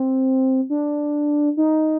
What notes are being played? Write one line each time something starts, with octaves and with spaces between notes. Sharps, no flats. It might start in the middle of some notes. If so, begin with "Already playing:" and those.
Already playing: C4
D4
D#4